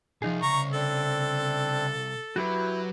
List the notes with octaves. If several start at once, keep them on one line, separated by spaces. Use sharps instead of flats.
C2 F3 D#4 G#4
C#3 A#5 C#6
C4 D4 A4
F#3 E4 F#4 G4 B4